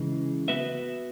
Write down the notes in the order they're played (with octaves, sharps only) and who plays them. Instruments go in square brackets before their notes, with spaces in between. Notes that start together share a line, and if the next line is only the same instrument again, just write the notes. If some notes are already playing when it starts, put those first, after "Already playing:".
Already playing: [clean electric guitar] C#3 E3 G#3
B3 F#4 B4 E5